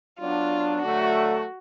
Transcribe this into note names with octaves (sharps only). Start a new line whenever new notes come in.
F#3 B3 D4 F4
D3 F#3 A3 F#4